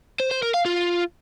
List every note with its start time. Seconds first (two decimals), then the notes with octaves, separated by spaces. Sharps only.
0.20 C5
0.31 C5
0.43 A#4
0.54 F5
0.65 F4